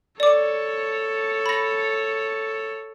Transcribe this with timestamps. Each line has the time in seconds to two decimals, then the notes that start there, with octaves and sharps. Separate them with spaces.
0.20 A4 C#5 D5 D6
1.46 B5 A#6